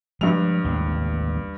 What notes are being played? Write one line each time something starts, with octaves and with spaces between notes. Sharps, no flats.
G2 F3 G3 G#3 F7
A1 D#2 G#3